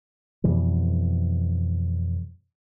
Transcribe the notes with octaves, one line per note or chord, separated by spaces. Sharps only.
F2 B2 E3 G3